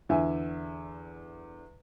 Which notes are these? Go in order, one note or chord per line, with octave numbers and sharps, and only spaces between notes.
E2 D3 E5 G#5